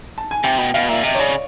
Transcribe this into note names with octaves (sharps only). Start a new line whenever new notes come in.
A5
G#5
C3 G5
B2 G5
B2 F5
A#2 E5
C3 D#5
C#5
C#3 D5